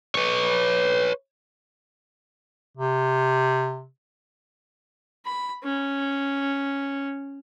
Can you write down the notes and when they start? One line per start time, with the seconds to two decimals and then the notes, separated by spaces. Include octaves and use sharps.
0.15 B4 C#5
2.78 C3
5.26 B5
5.64 C#4